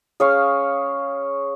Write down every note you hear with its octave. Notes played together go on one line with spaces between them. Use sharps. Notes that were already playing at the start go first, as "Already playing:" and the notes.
C#4 G#4 C#5 F5